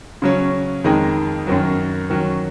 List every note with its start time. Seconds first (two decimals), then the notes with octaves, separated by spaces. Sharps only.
0.22 C#3 F#3 C#4
0.84 F2 D#3 G#3 D#4
1.47 F#2 D#3 F#3
2.10 D#3 F#3 C#4